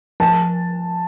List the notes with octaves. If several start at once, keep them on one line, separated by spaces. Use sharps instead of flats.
F3 A5